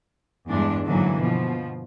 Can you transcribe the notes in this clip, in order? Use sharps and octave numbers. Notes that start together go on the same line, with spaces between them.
E2 G2 G#3 D4
G#2 D3 E3 F#3 A#3
B2 F3